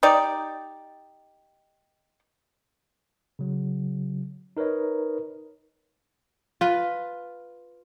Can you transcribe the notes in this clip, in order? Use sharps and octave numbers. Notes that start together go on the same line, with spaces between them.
D#4 G4 D5
C#3 F#3
D#4 A#4 B4 C#5 D#5
F4 B4